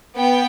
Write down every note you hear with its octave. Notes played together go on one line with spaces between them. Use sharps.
B3 G5